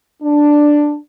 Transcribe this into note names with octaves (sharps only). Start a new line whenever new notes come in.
D4